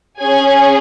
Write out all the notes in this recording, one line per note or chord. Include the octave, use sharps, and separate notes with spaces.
C#4 G#4 G#5